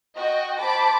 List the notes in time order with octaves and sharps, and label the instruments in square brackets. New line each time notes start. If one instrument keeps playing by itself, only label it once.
[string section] F#4 D#5 G5
C5 A5 B5 D6